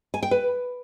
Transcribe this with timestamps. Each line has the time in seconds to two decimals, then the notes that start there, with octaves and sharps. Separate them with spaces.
0.14 G#5
0.23 G5
0.31 B4